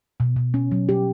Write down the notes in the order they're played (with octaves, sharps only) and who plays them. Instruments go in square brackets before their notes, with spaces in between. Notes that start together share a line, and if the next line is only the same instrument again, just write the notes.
[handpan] B2
B2
C#4
F#3
G4